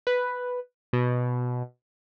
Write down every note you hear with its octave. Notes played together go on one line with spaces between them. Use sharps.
B4
B2